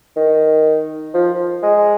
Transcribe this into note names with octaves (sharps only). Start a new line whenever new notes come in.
D#3
F3
G#3